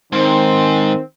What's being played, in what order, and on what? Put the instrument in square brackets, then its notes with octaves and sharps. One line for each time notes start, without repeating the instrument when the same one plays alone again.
[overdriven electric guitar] G#2 [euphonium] D#3 [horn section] C4 [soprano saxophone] C5